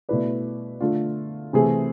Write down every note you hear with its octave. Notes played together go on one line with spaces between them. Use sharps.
B2 A3 E4 B4 D5
D3 A3 D4 F4
C3 E3 A3 C4 G#4